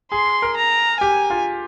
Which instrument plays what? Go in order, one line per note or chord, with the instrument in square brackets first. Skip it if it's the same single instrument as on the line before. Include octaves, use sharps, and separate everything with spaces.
[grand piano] G#4 [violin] C6
[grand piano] A#4
[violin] A#5
[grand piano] G4 [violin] G#5
[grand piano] F4